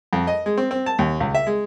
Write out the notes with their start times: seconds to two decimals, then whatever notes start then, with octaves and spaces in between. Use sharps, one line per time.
0.13 F2
0.27 D#5
0.46 G#3
0.58 C4
0.71 C4
0.86 A5
0.99 D#2
1.20 C#2
1.35 E5
1.47 G#3